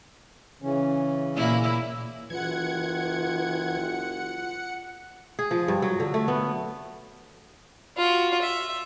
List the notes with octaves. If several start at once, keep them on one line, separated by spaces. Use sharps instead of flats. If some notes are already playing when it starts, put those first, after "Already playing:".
C#3 E3 C#4
A#2 A#3 E4
F#1 E3 F4 F#5 G#6 C#7
G#4
F3
G2
F#3
D3
A3
B3
F4 F#4
E5